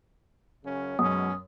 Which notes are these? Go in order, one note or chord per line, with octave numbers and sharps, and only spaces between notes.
F#2 C#3 C#4
F#2 B2 G#3 C#4 D#6